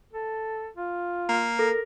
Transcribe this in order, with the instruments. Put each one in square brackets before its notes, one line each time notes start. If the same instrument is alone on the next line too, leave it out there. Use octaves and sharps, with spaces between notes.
[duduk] A4
F4
[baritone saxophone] A#3
[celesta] A4 [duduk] A#4